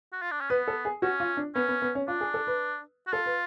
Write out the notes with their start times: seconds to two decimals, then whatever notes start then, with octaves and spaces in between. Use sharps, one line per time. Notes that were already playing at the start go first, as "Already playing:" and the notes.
0.12 F#4
0.22 F4
0.31 D4
0.41 C#4
0.50 B3 B4
0.68 A4
0.85 G#4
1.02 C#4 F#4
1.20 F4
1.37 D4
1.55 B3 C#4
1.69 B3
1.82 B3
1.95 C#4
2.08 D4 F4
2.21 G#4
2.34 A4
2.47 B4
3.07 F#4
3.13 F4 A4
3.26 B4